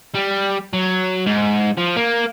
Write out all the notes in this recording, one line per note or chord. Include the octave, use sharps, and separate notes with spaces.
G3
F#3
G#2
F3
A#3